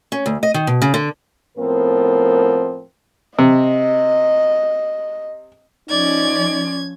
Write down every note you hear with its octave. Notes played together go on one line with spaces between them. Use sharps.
C#4
D2
D#5
D#3
B2
C#3
D3
A2 F3 B3 C4 A#4
C3 D#5
F3 C#4 D#4 D5 G#6